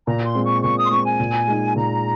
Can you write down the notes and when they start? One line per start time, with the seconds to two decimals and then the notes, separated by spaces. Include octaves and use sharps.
0.07 A#2 A#5
0.25 C6
0.35 G#3 C4
0.45 C#6
0.63 A#2 C#6
0.78 D#6
0.86 C6
0.91 G#3 C4 C#6
1.05 G#5
1.20 A#2
1.47 G#3 D#4
1.76 A#2 A#5